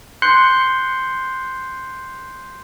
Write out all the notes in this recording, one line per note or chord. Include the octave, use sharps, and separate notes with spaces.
C6 F#6 G6 C7 C#7 G7